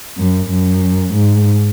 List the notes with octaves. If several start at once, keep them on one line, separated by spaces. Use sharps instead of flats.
F#2
F#2
G#2